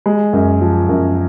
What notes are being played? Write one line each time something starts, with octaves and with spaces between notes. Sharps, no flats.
G#3
F#2
F3
F#2